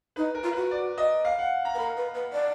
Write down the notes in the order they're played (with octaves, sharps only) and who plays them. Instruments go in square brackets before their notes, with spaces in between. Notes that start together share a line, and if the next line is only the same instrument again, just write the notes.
[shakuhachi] D#4 [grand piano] B4
[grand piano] A#4
[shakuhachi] F4
[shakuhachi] F#4 [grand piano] B4
[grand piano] D5
D#5
F5
F#5
A#5
[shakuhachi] B4
[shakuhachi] A#4 [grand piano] B5
[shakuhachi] B4
B4
D5